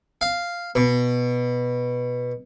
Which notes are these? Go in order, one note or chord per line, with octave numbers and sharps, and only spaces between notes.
F5
B2